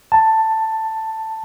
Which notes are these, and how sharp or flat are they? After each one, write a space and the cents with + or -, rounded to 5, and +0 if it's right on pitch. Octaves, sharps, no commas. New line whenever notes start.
A5 +10